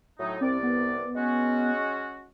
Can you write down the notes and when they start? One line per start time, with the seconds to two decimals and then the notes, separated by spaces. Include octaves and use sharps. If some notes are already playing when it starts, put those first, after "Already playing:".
0.19 A2 F#3 D#4
0.41 C2 C4 D5
0.63 B3
1.15 G#3 C#4 F#4